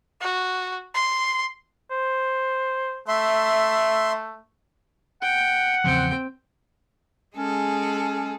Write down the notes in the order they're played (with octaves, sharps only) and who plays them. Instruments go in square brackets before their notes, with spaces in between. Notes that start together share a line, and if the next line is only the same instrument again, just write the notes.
[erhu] F#4
C6
[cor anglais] C5
[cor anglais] A3 [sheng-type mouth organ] E5 C6
[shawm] F#5 [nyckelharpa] G5
[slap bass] E2 C#3 F3 [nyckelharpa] C4 G5
[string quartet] G#3 G#4 A4 [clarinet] C#4